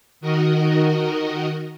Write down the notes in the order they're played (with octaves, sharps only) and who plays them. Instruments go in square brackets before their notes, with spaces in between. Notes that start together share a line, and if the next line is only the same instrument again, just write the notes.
[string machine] D#3 F#4 A#4 D#5